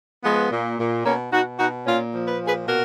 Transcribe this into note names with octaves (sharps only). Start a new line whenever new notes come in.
F3 G#3 B3
A#2
A#2
B2 A#3 C#4
B2 D#4 F#4
B2 D#4 F#4
A#2 C#4 F4
F3
B4
A#2
G#4 B4
B2 F#4 A#4